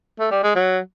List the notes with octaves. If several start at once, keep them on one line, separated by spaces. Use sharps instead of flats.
A3
G3
G#3
F#3